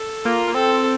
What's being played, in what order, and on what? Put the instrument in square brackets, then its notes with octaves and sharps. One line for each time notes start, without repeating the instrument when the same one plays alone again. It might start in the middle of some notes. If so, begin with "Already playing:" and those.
Already playing: [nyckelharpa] A4
[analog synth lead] A#3 [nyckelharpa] F4
[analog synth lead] A#3
[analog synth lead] C4 [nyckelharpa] A4